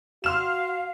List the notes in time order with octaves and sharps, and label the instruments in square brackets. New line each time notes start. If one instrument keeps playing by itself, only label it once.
[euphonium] F#4 [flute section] F5 [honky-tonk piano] C6 F6 E7